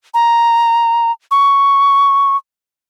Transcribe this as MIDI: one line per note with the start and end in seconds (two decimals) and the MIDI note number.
0.14 1.12 82
1.31 2.36 85